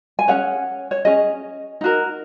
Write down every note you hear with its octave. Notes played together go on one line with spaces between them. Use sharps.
G#5
C#4 G#4 C#5 F#5
C#5
C#4 G#4 D#5
D#4 F#4 A#4